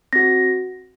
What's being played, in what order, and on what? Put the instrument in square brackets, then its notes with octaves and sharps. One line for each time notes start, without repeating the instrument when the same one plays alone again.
[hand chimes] C4 F#4 A#6